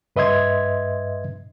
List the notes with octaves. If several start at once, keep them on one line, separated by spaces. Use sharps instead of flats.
G2 B4 D#5 E5 C6 G#6